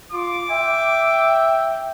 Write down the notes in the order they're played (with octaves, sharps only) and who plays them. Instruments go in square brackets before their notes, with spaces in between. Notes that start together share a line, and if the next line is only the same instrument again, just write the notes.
[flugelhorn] F4 [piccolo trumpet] D6
[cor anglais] E5 [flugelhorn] G5